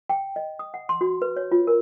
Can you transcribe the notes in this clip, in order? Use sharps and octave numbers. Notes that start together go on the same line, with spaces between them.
G5
D#5
D#6
F#5
C6
F#4
B4
C#5
F4
A#4